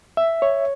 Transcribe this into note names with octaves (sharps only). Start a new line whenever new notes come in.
E5
C#5